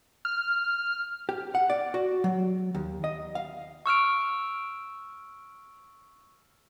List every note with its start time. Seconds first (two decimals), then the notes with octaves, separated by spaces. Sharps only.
0.25 F6
1.29 G4
1.55 F#5
1.70 D5
1.94 F#4
2.24 F#3
2.75 D#2
3.04 D#5
3.35 F5
3.86 C#6 E6 F6 D7